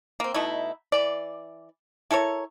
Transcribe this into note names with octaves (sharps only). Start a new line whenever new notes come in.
A#3 C4
B2 A3 D#4 E4
E3 D5
E4 A4 A#4 C#5